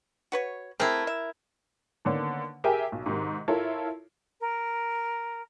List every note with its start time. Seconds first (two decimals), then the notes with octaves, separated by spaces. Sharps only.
0.32 F#4 B4 C#5
0.80 A3 C4 E4 G#4 A#4
1.07 E5
2.05 D3 D#3 A#3 B3 C#4 D4
2.64 G4 G#4 A#4 E5 G5 G#5
2.92 B1
3.06 G#2 C3 D#3
3.48 E4 F4 A4 A#4 C#5
4.40 A#4